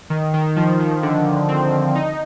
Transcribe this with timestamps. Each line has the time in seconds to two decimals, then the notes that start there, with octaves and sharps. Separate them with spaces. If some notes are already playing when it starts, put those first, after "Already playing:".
0.10 D#3
0.34 D#3
0.56 F3
0.80 D#3
1.03 D3
1.49 C4
1.95 D#4